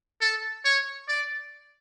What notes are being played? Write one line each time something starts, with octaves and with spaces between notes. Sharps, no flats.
A4
C#5
D5